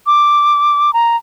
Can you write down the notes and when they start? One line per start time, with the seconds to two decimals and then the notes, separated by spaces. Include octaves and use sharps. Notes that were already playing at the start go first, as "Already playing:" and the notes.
0.07 D6
0.93 A#5